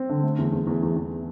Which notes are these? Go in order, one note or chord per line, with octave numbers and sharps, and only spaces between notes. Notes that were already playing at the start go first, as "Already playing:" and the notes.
Already playing: C4
D3
A3
E2
E2
E2
E2
E2